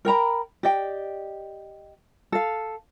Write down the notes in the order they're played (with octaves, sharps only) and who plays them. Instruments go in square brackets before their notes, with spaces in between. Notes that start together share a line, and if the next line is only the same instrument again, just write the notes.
[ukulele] A#4 G5 A#5 B5
G4 D5 D#5 G5
A4 F5